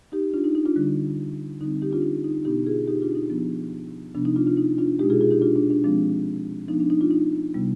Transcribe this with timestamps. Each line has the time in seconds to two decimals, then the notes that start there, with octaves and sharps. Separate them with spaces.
0.12 D#4 G4
0.34 D4 F4
0.44 D#4
0.55 D#4
0.65 D4 F4
0.76 D3 G3 D4
1.61 D3 G3 C4 D#4
1.82 D#4 G4
1.92 D4 F4
2.02 D#4
2.24 D#4
2.45 B2 B3 D4 D#4 G4
2.66 F4 G#4
2.87 D#4 G4
3.02 D4 F4
3.15 D#4
3.30 F3 B3 D4
4.15 C3 F3 B3 D4
4.25 D#4
4.36 D4 F4
4.47 D4 F4
4.57 D#4
4.78 D4 F4
4.99 B2 G#3 D4 D#4 G4
5.10 F4 G#4
5.21 F4 G#4
5.31 D#4 G4
5.41 D4 F4
5.56 D4
5.70 D4
5.84 F3 G#3 C4 D4
6.68 F3 B3 D4 D#4
6.80 D4
6.90 D#4
7.01 D4 F4
7.11 D#4
7.54 C3 G3 B3